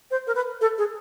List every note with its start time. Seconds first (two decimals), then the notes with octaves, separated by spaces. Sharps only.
0.11 C5
0.27 A#4
0.35 B4
0.61 A4
0.78 G#4